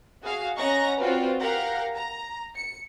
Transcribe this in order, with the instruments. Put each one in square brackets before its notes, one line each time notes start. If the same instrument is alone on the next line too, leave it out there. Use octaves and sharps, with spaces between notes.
[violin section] F#4 G#4 F5
C#4 D#5 F#5 A#5 C#6 A#6
C4 F4 F#4 B4 D5
G4 A#4 F5 F#5 A#5
A#5
C#7